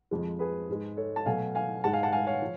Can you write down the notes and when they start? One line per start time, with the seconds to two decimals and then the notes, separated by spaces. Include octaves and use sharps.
0.11 F2 F3 G#3
0.39 G#4 B4
0.69 G#2 G#3
0.97 A4 C#5
1.16 A5
1.26 B2 F#3 A3 F5 G#5
1.55 F5 G#5
1.84 G#2 G#3 F#5 A5
1.93 F5 G#5
2.03 F#5 A5
2.12 F5 G#5
2.27 C#5 F5
2.42 F3